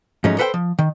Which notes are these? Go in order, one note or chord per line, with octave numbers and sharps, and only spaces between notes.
G#2 F3 F#3 A3 C#4 D#4
A4 B4 C5 F#5 G5
F3
D#3